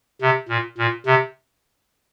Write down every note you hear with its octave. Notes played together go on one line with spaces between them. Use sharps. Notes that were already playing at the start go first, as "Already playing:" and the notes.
C3
A#2
A#2
C3